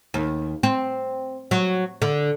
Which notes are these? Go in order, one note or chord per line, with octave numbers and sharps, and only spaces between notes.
D#2
C4
F#3
D3